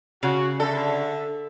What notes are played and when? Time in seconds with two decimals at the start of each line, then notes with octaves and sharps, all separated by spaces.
0.23 C#3 F#4
0.60 D3 D4 A4 E5